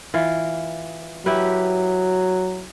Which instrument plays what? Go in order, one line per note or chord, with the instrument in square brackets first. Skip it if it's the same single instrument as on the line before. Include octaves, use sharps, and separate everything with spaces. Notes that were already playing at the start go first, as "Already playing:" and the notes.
[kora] E3 F4
[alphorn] F#3 [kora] E4 G4 B4